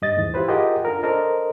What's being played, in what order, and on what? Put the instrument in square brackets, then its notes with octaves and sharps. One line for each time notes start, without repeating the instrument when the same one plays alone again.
[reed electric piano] G2 D#5 A6
D#2 G#2 E3
E4 F4 G4 B4 C5
F4 G4 G#4 A#4 D#5 F#5
D4 F4 A4 A#4
D4 A4 A#4 C5 D#5